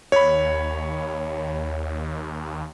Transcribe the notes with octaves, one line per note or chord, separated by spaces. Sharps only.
D#2 C#5 B5